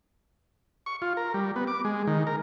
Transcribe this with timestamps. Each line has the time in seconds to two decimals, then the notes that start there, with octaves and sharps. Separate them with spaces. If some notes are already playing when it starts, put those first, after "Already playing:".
0.86 C#6
1.02 F4
1.17 A#4
1.34 G3
1.56 B3
1.67 D6
1.85 G#3
2.07 D#3
2.27 A#4